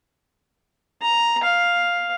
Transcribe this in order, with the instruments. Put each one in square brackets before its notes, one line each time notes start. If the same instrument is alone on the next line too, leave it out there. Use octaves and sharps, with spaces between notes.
[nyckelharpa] A#5
F5